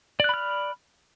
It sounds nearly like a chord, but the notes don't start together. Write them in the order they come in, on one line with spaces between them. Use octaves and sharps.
D5 F#6 B5 F6